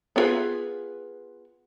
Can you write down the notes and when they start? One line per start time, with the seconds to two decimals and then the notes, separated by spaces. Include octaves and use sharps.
0.16 B3 D4 F4 G#4 B4